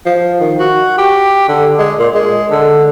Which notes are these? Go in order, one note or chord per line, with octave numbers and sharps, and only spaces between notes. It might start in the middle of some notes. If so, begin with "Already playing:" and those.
F3
D#3
F#4
G4
D3
G#3
A#2
G#3
D3